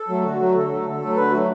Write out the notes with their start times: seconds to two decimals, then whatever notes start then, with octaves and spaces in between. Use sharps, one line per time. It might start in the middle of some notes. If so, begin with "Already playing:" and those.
Already playing: A4
0.08 F#3 A3
0.23 D3 F#4
0.39 F#3 A3
0.55 D3 A4
0.70 F#3 A3
0.86 D3
1.01 F#3 A3
1.16 D3 B4
1.32 F#3 A3 F#4